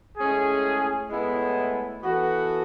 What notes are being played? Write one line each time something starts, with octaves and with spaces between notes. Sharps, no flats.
A2 G#3 C#4 G#4
A2 G#3 B3 E4
E3 B3 F#4 A4